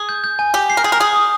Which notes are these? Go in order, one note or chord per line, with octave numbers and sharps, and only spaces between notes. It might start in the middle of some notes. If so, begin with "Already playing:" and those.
Already playing: G#4
G6
G6
G#5
G4 G7
C7
A#4
G#4 C7
A#4
G#4 D#6
D#6